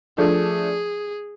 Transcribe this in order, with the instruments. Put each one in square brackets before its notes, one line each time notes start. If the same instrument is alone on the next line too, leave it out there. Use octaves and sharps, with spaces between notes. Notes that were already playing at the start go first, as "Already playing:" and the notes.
[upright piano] F3 A3 D4 [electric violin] G#4